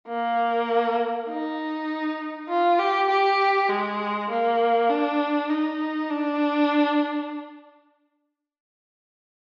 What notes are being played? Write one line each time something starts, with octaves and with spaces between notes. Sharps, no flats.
A#3
D#4
F4
G4
G4
G#3
A#3
D4
D#4
D4